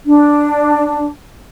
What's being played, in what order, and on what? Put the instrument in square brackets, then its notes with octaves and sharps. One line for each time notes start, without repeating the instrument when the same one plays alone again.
[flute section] D4